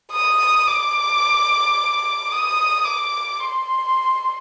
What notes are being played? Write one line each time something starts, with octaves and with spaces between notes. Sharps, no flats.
D#6
D6
D#6
D6
C6